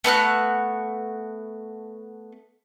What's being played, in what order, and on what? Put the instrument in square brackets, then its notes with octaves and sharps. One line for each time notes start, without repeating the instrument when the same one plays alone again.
[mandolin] A3 B3 F#4 F#6